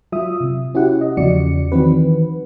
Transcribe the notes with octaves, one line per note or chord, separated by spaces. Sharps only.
F#3 F4 E5 D#6
C3
C#4 E4 F#4 G4 F#5
D#5
E2 C#3 F3 F#4 D5 C#7
D#3 E3 F#3 C4 F#4 B4